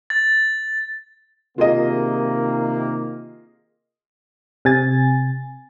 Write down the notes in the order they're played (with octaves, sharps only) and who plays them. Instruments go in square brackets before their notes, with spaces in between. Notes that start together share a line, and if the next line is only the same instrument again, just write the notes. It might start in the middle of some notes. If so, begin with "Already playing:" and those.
[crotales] A6
[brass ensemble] C3 D#3 A#3 [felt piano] F4 G#4 D#5
[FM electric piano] C3 G#5 A6